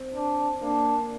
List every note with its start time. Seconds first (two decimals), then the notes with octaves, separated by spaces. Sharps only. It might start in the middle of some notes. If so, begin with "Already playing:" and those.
Already playing: C4
0.15 D4
0.62 A#3 D4